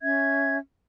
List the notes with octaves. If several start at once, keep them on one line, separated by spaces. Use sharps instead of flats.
C#4 E5 G#6